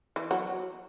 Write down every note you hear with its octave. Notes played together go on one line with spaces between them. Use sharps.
E3
F#3